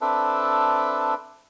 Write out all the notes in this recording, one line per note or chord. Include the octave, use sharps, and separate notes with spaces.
C4 D4 A4 B4 E5